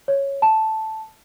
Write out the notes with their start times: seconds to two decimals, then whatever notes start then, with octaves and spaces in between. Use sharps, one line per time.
0.08 C#5
0.42 A5